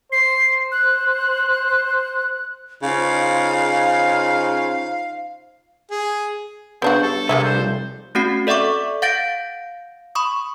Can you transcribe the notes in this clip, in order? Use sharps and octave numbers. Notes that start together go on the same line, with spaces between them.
C5 C7
F#6
C#3 D#4 F4 C5 F5
G#4
C#3 B3 D4 F#4 C5
G2 A4
C2 A#3 G#4 E5
C5
F1
A3 C4 C#4 F#4 F#5 C7
A4 D5 E5 F#5 C#6 D6
F5 F#5 G6 A6 A#6 D7
B5 C#6 D#6